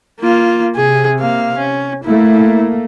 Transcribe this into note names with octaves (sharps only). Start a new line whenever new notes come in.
A#3 F4
C3 G#4
A#3 F5
C#4
A3 A#3 E4